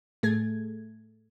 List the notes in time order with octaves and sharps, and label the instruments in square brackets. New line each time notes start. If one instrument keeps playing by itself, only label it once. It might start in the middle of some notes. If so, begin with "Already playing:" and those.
[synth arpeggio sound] A2 A3 G#4 A4 G#6